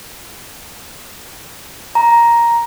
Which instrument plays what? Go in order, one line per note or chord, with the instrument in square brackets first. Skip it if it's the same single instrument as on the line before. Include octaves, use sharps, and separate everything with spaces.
[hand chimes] A#5